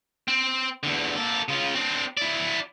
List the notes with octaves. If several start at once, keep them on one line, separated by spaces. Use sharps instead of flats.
C4
E2 D3
A#3 A4
C#3 F4
C4 D4
E4 D5